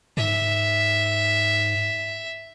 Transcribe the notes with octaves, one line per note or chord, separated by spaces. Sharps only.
G#2 E5